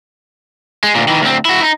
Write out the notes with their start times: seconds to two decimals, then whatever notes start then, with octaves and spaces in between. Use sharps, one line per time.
0.84 G#3
0.95 D2 A#2
1.08 D#3 E3
1.22 D2 C4
1.45 E4 F#4
1.62 D#4